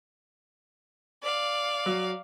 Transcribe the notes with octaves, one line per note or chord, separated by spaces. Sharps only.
D5 F5
F#3